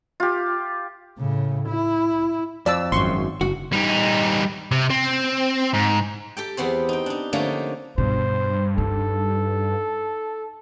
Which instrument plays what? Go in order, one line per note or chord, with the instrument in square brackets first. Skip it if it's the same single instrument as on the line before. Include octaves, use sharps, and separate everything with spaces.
[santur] F4 G4
[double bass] A2 C#3
E4
[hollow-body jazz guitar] F2 [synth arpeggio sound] D5 A5 E6
[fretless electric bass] G#1 F#2 [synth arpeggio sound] C6 C#6
[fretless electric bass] F#1 [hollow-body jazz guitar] F#4
[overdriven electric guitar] G3 D#4
C3
C4
G#2
[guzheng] G4 A4 G5
E2 B3 C4 C5
D#4 G5
D4 D#4
D3 F3 A3 A#3 C#4 D#4
[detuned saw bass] G2 [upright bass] B2 [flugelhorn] C5
[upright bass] D#4 [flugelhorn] A4